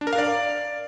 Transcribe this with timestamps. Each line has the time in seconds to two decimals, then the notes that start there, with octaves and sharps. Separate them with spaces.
0.01 D4
0.07 A#4
0.13 F5
0.18 D5